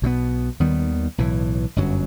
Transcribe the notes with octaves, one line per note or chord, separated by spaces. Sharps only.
B1 B2 G3 B3
D#2 D#3 G3 B3
B1 A2 E3
G1 F#2 F#3